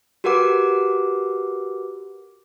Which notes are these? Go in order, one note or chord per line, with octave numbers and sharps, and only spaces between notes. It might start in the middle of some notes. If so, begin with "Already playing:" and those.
F#4 G4 A#4 B4 F#5 D6